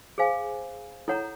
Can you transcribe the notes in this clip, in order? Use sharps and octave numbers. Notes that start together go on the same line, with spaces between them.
G#4 C5 F5 G#5
E4 A4 C#5 F#5 A#5